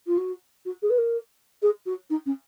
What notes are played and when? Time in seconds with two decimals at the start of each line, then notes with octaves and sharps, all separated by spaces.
0.07 F4
0.17 F#4
0.65 F#4
0.82 G#4
0.90 B4
0.98 A#4
1.62 G#4
1.86 F#4
2.10 D#4
2.26 C#4